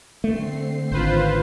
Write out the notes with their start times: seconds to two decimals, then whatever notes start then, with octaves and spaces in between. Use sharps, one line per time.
0.24 D3 A3 C4 C7
0.92 G#1 F4 B4 C5